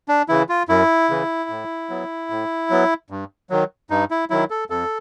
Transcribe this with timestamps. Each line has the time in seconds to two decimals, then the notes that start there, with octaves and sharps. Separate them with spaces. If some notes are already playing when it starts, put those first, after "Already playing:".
0.08 D4
0.28 C#3 E3 E4
0.49 F4
0.69 F#2 E4
1.10 C#3 E3
1.50 A2
1.90 F#3 B3
2.30 A2
2.70 F#3 B3
3.10 G2
3.50 D#3 F#3
3.90 G2 D#4
4.11 E4
4.30 D#3 F#3 E4
4.50 A4
4.70 F2 A4